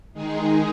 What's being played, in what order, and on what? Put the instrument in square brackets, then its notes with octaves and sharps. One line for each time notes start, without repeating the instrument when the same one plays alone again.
[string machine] D#3 G#3 D#4 G#4